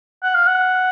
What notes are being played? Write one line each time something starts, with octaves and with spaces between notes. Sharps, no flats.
F#5
F5
F#5